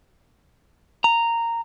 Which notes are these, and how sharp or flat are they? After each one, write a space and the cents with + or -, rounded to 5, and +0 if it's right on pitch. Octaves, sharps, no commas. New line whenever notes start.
A#5 -10